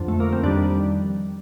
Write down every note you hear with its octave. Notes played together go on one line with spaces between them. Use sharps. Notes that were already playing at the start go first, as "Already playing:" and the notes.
Already playing: F2 D3 F3
A3
A#3
C4
F2 D#3 G3 D4